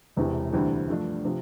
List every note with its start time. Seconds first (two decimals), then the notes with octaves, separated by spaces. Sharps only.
0.17 E1 E2 C3 E3
0.53 D2 C3 E3 G3
0.88 G2 F3 A3 D4
1.25 C3 F3